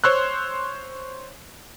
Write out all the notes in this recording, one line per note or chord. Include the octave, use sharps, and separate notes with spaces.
C5 C#5 C6 E6 F#6